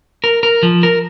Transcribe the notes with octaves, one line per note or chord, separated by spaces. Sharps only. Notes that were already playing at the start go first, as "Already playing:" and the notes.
A#4
A#4
F3
A#4